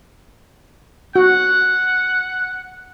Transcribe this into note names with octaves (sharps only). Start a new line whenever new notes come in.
F#4 F#5